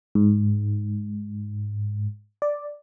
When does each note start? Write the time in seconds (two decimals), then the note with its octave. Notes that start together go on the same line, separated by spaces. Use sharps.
0.15 G#2
2.42 D5